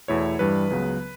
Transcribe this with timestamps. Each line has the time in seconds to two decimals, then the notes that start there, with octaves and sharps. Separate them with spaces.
0.08 E2 B2 A3 E4 C#5
0.39 G2 E3 G3 B4
0.70 C#2 C#3 F#3 B3